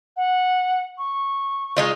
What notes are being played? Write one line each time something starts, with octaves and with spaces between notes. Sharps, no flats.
F#5
C#6
G#3 D#4 F4